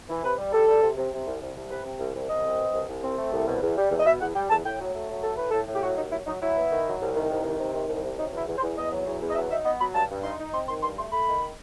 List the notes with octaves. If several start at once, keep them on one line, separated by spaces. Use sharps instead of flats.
E3
C3 B4
G3
G3 A4
G3
C3
C3
C3
C2
C2
C2
C3 B4
C3
C2
C2
C2 D#5
C4
B2
C2
C2
C4
A3
C2
B2
E2
G3
E2
D#5
B2 E5
E2 F#5
G3 G5
E2 A5
A2 G5
F#3
A3
F#3
A3 A4
A2 B4
A2 A4
A2
G4
F#3 F#4
D#2 D#4
F#3 E4
F#3 D#4
F#3 E4
B3
D#3
F#3
C2
D#3
C2
D#3
C3
D#3
C2
C3
F#3 D#4
E2 E4
E2
C5
E2
E2 D#5
F#3
E2
E2
D#5
F#3 E5
D#4 E5
B3 D#5
F#3 B5
G2 A5
G2
D#4 C6
D#4
C4 C6
D#3 C6
G2 C6
A3 C6
A3 B5
D#3